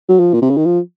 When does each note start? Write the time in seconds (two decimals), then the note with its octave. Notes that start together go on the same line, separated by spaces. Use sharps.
0.09 F#3
0.20 F3
0.33 A#2
0.42 C3
0.50 C#3
0.57 D#3
0.65 F3